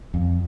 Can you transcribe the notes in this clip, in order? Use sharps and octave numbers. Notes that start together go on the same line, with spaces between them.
F2